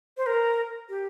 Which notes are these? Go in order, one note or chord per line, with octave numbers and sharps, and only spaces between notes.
C5
A#4
G4